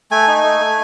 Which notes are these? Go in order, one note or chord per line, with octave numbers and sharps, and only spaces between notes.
A3 G#5
D#4
A3
A3